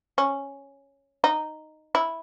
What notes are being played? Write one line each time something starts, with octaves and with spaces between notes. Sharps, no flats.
C#4
D#4
E4